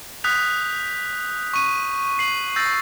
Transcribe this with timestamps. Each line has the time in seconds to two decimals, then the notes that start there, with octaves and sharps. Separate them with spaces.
0.24 D#6 F#6 G6 B6 F7
1.53 C#6 D#7
2.19 C7 F#7
2.56 E6 G6 A6 A#6